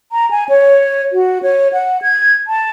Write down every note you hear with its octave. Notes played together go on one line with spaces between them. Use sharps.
A#5
G#5
C#5
F#4
C#5
F#5
G#6
A5